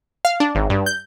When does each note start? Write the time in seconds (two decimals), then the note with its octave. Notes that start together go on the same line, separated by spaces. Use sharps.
0.25 F5
0.40 D4
0.55 G#1
0.70 G2
0.86 G6